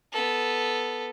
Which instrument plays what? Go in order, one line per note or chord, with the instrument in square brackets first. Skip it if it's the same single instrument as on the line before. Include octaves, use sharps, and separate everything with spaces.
[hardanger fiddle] B3 A4